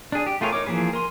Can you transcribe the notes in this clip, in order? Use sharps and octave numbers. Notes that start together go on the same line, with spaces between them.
D4 G#4
G4
A3 F4 G#4 A#4 C#5
D#4 A#4 C#5 D6
E3 F3 A#3 G#4 B4
A#4 G#5 C6